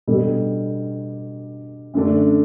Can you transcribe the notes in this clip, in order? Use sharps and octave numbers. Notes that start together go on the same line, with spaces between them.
B2 G3 D4 A4
F#2 D3 A3 D4